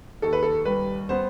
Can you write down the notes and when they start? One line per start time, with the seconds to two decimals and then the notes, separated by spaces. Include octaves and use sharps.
0.22 D#2 A4
0.33 B4
0.43 A4
0.65 G3 B4
1.09 B3 C5